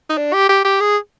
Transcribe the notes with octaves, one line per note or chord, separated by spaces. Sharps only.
D#4
D4
G4
G4
G4
G#4